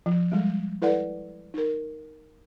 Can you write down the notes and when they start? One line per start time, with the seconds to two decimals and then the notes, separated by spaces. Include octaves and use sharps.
0.06 F3
0.32 G3 G#3
0.82 E4 A4 B4 D5 F#5
1.54 D#4 A#4